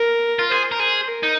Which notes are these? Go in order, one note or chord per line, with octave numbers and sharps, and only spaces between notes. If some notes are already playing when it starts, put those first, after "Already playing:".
Already playing: A#4
F4
G#4 C5
A#4
G#4 C5
A#4
D#4